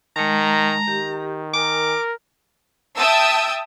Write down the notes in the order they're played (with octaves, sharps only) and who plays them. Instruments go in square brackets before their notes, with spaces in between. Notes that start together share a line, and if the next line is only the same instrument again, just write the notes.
[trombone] D#3 [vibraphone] G#3 A5 [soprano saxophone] A#5
[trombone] D#3 [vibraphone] G4
[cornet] A#4 [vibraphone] G#5 [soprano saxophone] D6
[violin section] E5 G5 A5 D#6 E6